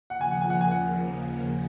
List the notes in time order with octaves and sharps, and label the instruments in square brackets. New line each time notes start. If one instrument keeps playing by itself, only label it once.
[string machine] D#2 C#3 F3 A#3 [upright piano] F#5
[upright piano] G#5
F#5
G#5
F#5
G#5
F#5